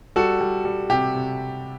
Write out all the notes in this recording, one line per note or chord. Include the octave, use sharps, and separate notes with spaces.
G3 F#4 A4
G3
G3
C3 G4
C3